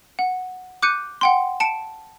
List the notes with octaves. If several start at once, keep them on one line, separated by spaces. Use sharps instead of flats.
F#5
D6 F#6 G6 C#7 D#7
F#5 G5 C6
A5 C#7 D7 E7